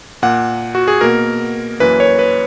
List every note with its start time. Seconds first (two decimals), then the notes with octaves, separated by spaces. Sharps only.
0.22 A#2 A#3 F#5
0.75 F#4
0.88 G#4
1.01 B2 A#3 A#4
1.80 F#2 E3 A#3 B4
2.00 C#5
2.19 B4